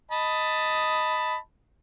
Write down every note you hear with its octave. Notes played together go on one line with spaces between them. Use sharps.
D#5 A5 B5